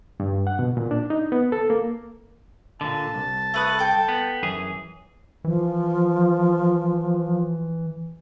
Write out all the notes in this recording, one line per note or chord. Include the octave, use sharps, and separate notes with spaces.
G2
F#5
B2
A#2
D4
D#4
B3
A4
A#3
A#2 D3 A5
C2
A3 B4 D#6
A4 G5
B3
F#2 E3 G#4
E3 F3